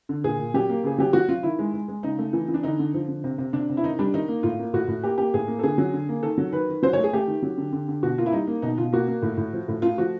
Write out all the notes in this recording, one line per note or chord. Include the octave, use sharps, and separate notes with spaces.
D3
A#2 G#4
A#2
F#3 G4
A#3
C#3 G#4
F#3 G4
F#3 F#4
F#3 F4
D#3 E4
G#3
G#3
G#3
C#3 D#4
A3
E3
E3
D4
D3 D#4
D3
F3
D3
C3
C3
C3 D4
C3
E4
D#3 D#4
G3 D4
D#3 D#4
A#3
A2 F4
A#3
A2 F#4
A2
A#3 G4
A#3 G4
A2 G#4
A#3
A4
D3 G#4
F#3
D3
A#3
D#3 A4
F#3
D#3 B4
D#3
F#3 C5
A3 C#5
G#4
A3 G4
D#3
F#3
D3
D3
D3
B2 F#4
A#3 F4
E4
G3 D#4
A#3
B2 D#4
B2 F4
A#3 F#4
A#3
A2
A2
F3
A2
A3 F4
F3 F#4